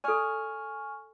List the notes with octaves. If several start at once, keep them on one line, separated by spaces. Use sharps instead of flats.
A4 D5 G#5 C#6 F6